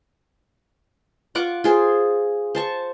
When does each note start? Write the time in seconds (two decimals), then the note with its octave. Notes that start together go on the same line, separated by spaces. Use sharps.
1.35 F4 F#5 C#6 D6
1.64 F4 G#4 C5
2.55 C5 A5 C#6